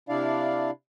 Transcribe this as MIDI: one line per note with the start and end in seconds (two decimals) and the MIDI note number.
0.09 0.71 48
0.09 0.71 62
0.09 0.71 64
0.09 0.71 74
0.09 0.71 77